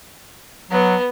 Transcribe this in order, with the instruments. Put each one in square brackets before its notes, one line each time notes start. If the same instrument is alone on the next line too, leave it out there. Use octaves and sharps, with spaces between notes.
[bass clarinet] F#3 [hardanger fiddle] B3